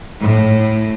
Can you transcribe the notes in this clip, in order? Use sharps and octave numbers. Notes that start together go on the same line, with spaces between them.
A2